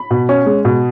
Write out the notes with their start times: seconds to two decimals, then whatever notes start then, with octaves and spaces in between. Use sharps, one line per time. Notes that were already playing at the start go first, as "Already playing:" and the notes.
Already playing: B5
0.11 B2
0.29 C#4
0.46 G#3
0.65 B2